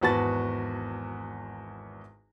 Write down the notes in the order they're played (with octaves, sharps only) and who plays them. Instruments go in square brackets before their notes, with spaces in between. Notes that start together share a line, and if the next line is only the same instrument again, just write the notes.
[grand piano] G#1 E2 F#4 B4 A5 A6